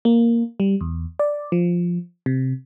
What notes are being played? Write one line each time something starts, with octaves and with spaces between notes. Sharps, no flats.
A#3
G3
E2
D5
F3
C3